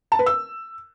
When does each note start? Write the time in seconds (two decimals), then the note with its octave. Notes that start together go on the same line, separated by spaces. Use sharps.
0.12 A5
0.19 B4
0.26 E6